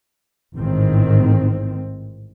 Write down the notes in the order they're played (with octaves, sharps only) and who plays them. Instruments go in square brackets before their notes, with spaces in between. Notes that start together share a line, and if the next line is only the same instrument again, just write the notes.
[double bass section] A1 G#2 D#3 C4